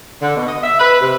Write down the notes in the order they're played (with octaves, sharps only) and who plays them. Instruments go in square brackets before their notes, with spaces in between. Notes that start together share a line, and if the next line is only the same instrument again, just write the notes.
[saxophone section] D3
B2
D#5
E5
B4
C3